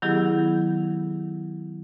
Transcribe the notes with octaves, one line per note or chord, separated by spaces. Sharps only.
D#3 F#3 B3 E4 G4 G#4